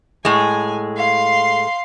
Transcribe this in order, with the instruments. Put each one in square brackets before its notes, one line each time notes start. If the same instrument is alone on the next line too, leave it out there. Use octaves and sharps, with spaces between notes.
[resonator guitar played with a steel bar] A2 G#3 [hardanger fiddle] G#5
[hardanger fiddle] F5 C6